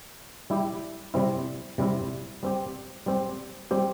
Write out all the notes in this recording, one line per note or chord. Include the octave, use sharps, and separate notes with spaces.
G3 E4 G4
C3 G3 C4 E4
C3 G3 C4 E4
G3 C4 G4
G3 C4 G4
G3 C4 G4